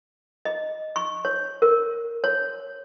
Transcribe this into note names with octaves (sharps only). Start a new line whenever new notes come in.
D#5
C#6
C#5
A#4
C#5